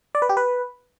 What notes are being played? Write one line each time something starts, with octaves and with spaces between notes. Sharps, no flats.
D5
B4
G4
B4